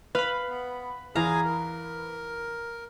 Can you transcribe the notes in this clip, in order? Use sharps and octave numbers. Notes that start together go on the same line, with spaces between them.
B4 F5 B5
B3
E2 G#4 F5 G#5 A#5
A#4